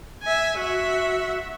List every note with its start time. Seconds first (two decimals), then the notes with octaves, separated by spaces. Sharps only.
0.23 E5 G#5
0.57 F#4 E5